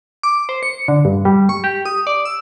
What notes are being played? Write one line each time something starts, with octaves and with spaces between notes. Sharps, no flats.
D6
C5
C#7
D3
G2
G3
C#6
G4
D#6
D5
E6